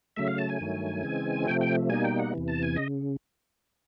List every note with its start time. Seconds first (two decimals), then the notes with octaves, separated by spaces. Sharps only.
0.16 C#3 F#3 A3 E5
0.28 F5
0.38 A5
0.49 G#5
0.61 G2 D#3 F#3 A3
1.03 C#3 E3 G#3 C4
1.47 C3 F3 A3 G5
1.61 G5
1.89 B2 G3 A#3 D#4 G#5
2.04 G5
2.19 F#5
2.33 E2 C3 E3
2.48 A5
2.63 G#5
2.76 C#3 D#5